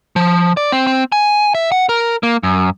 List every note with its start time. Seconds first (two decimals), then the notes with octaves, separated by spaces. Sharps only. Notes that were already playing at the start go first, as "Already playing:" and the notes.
0.16 F3
0.57 D5
0.72 C4
0.87 C4
1.12 G#5
1.55 E5
1.72 F#5
1.89 A#4
2.23 A#3
2.43 F#2